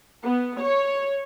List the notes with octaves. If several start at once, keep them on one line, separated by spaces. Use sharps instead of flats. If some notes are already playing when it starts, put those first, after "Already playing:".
B3
C#5